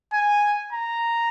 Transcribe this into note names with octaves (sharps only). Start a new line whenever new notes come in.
G#5
A#5